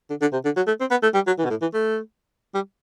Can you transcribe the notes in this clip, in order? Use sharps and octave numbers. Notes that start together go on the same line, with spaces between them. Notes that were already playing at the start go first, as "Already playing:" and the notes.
D3
D3
C3
D3
F#3
A3
C4
B3
A3
G3
F#3
E3
B2
A2
E3
A3
G3